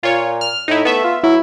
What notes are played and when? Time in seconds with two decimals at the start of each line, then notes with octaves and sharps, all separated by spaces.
0.03 A#2 F4 C#5
0.41 F6
0.68 A2 D#4 E4
0.85 A3 B3 E5
1.04 F4
1.24 F#3 E4